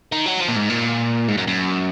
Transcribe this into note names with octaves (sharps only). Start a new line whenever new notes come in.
D#3
F#3
F3
A#2
G#2
A#2
G#2
F#2
F#2